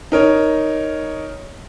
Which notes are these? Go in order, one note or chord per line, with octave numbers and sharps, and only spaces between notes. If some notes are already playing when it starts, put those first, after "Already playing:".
D#4 A#4 C#5